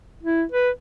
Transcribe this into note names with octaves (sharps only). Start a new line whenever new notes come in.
E4
B4